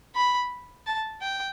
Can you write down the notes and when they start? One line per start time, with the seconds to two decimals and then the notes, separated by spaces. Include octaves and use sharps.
0.15 B5
0.86 A5
1.21 G5